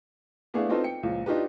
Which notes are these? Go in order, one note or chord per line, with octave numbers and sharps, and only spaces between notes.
A3 B3 D4 E4 G#4 F5
B3 C4 D#4 F4 A4 B4
G5 C#7
C#2 A#2 F3
D4 D#4 F4 G4 B4